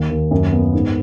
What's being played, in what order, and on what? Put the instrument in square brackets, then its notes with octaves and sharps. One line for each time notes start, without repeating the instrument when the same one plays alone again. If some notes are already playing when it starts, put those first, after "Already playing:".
Already playing: [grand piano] D#2
D#2
F#2
B3
G#2